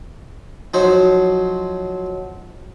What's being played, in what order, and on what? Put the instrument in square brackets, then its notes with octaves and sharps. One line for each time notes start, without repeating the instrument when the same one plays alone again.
[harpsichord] F3 F#3 D#4 C5 C#5